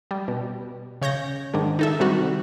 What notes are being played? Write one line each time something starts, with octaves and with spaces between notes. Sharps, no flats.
G3
B2
C#3 C#5 G6 A#6
G#2 D#3 D4
D#4 A4 E5
C3 D#3 G3 F#4